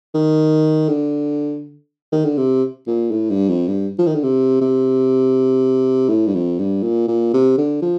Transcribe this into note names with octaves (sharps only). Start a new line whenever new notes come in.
D#3
D3
D#3
D3
C3
A#2
A2
G2
F2
G2
F3
D#3
D3
C3
C3
A2
G2
F2
G2
A#2
A#2
C3
D3
F3